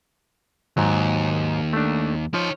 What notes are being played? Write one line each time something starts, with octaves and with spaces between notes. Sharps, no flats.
D#2 G#2 F#3
A3 D4
F3 D#4 C#5